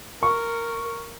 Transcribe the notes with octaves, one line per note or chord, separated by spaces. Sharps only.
A#4 C#6